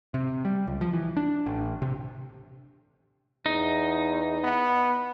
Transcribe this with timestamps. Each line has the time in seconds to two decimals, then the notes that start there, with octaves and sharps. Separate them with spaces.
0.14 C3
0.45 G3
0.67 C#2
0.81 F3
0.93 E3
1.17 D4
1.46 A1
1.82 C3
3.46 E2 D#4
4.44 B3